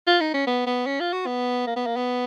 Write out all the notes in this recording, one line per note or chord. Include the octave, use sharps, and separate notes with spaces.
F4
D#4
C#4
B3
B3
C#4
F4
F#4
B3
A#3
B3
A#3
B3